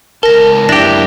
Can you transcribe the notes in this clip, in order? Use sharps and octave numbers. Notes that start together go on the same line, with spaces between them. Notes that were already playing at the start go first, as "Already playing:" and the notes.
C#2 A#4 A5 A#6
F#2 D4 E4 G4 A#6